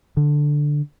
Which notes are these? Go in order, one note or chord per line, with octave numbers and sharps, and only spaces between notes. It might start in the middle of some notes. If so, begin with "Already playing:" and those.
D3